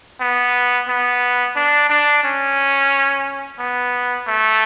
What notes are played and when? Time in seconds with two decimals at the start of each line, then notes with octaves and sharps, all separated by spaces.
0.21 B3
0.89 B3
1.56 D4
1.90 D4
2.24 C#4
3.59 B3
4.27 A3